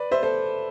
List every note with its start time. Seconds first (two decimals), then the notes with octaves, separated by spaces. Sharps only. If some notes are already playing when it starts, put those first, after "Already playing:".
Already playing: B4 D5
0.12 C5 E5
0.23 A4 C5